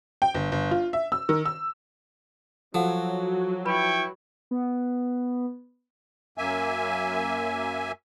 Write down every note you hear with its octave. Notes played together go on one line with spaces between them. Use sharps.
G5
G1
G1
F4
E5
E6
D#3
E6
F3 F#3 A4 F#5
E4 B4 G5 B5 C#6
B3
F#2 A#3 E5 G#5